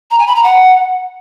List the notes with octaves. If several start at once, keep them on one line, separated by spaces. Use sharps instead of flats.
A#5
G#5
B5
A#5
F#5